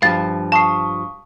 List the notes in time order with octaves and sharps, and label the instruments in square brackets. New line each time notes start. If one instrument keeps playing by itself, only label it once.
[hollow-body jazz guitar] G2 F3 [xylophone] F5 A6
[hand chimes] F5 C#6 D#6 [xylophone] A5 C7